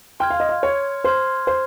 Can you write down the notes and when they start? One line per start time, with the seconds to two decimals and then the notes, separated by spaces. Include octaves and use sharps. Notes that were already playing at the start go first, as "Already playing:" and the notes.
0.20 G5 C6 F6 G#6
0.30 F5
0.40 D#5
0.49 F5
0.63 C#5
1.04 C5 C6 F6 G#6
1.47 C5